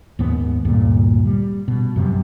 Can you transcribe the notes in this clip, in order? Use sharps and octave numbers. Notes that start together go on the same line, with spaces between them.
D#2 G#2 B3
D2 G2 A#2
G3
B2
F#2 C3 G3